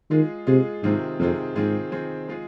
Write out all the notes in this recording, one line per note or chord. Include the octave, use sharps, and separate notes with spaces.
D#3 G#3 F4 G#4
C3 G#3 F4 G#4
G#2 C3 D#3 C4 F4 G#4
F2 C3 D#3 C4 F4 G#4
G#2 D#3 C4 F4 G#4
D#3 C4 F4 G#4
G#3 F4 G#4